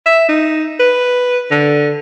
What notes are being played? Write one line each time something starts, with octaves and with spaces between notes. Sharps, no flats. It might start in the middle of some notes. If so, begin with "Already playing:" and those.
E5
D#4
B4
D3